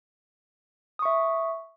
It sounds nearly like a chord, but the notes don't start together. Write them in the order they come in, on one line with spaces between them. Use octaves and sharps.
D#6 C#6 E5